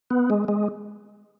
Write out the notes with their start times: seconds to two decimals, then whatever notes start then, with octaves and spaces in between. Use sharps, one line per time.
0.10 B3
0.30 G#3
0.48 G#3